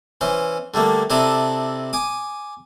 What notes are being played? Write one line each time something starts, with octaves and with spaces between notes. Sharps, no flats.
E3 C#4 C5
D3 G3 A3 A#3
C3 D4 E4 A4 A#5 D#6
G#5 D6 D#6